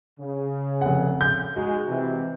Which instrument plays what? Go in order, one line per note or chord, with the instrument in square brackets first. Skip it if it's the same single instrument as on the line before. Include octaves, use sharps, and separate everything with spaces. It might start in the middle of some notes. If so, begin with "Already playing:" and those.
[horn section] C#3
[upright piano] F1 F#5
G6
[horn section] G#3 D#4 [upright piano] F#4
[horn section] C3 E3